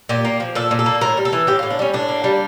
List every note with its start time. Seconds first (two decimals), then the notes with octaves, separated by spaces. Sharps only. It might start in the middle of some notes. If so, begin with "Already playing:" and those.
0.09 A#2 G4
0.25 A#3
0.40 F3
0.55 A#2 A4
0.71 A#2
0.79 A4
0.86 A#3
1.01 A2 A#4
1.17 G3
1.25 A4
1.33 E3
1.47 A2 G4
1.59 F4
1.63 A2
1.70 D4
1.79 G3 C#4
1.94 A2 D4
2.09 A#3
2.24 G3